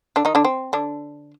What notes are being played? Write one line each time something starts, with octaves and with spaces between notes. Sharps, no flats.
D3 D4
D#3 D#4
D3 D4
C4
D3 D4